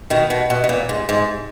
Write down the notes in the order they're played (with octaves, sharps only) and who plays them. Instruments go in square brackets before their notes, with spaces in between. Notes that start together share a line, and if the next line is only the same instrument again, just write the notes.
[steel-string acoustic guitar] B2 D#3
B2
B2
B2
A#2
G#2
G#2